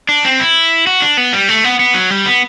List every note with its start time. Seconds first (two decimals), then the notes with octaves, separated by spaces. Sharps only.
0.09 D4
0.25 C4
0.40 E4
0.87 F#4
1.02 D4
1.17 B3
1.33 G3
1.48 A3
1.64 B3
1.79 B3
1.95 F#3
2.10 G3
2.26 B3